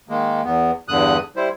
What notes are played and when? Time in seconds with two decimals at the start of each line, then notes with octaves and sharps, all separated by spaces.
0.09 D#3 G#3 A#3
0.44 E2 B3
0.88 E2 G2 D3 D#6 F#6
1.36 G3 E4 C5